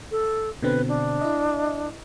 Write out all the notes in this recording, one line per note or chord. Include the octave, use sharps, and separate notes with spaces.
A4
B2 D3 C4 B4
D4
E4 D#5